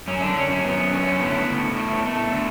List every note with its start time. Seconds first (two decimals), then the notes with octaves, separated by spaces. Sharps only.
0.08 F#2 C#4
0.22 D3 D4
0.36 F#2 C#4
0.50 C#4
0.64 F#2 B3
0.92 D3 C#4
1.20 A2 B3
1.48 A2
1.77 A3
2.05 A3
2.33 D3